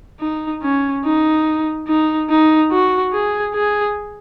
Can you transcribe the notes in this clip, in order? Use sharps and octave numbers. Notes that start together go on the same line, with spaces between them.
D#4
C#4
D#4
D#4
D#4
F#4
G#4
G#4